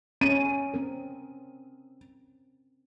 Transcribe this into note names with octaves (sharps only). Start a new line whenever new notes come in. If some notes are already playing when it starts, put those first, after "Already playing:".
C#4 D#7
C4 C#4 A#4